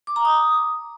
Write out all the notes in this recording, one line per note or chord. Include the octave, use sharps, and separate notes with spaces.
D6
A#5
D#6